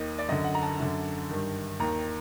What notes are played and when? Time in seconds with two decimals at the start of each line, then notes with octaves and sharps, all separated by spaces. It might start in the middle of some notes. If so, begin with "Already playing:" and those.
Already playing: D#2 D#3 D#5
0.19 D5
0.28 F#2 D3 D#5
0.44 F#5
0.55 A#5
0.63 A5
0.79 F#2 D3
1.30 G2 D#3
1.79 D#2 D#3 A#5